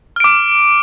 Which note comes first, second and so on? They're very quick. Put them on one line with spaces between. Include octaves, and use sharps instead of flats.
F6 D7 D6